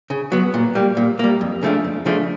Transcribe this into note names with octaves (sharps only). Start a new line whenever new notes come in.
C#3
F#3 B3
A#2
G3 A#3
A#2
G3 A#3
F2
C#3 F3 A3 D4
F2
C#3 F3 A3 D4